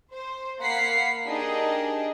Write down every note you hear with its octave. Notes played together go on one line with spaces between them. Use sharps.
C5
A#3 F5 F#5 B5 B6 C7
D4 D#4 G4 G#4 A#4 D#5